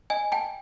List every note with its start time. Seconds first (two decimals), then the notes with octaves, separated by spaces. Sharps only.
0.10 D#5 G#5
0.32 G5 A5